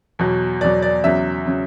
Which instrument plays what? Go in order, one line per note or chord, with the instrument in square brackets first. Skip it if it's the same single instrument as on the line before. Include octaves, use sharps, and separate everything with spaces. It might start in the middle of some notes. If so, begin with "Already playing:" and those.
[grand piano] E2 B2 F#3
E2 B2 F#3 D5
D5
E2 C#3 F#3 E5
C#3 F#3